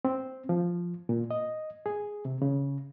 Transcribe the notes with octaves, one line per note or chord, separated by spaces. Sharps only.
C4
F3
A#2
D#5
G#4
C3
C#3